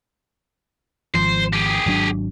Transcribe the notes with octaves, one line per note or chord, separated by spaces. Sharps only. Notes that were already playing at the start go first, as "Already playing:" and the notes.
G#1 F3 C5
G4 G#4
G#1 F#3 D4